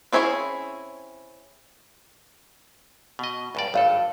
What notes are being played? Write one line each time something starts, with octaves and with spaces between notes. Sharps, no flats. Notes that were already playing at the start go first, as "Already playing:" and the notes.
C4 C#4 E4 G#4 C#5
B2 D#5
C#2 G2 D5
G#1 G2 A4 D5 F5